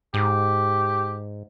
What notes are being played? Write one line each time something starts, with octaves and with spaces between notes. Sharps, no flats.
G#2 G4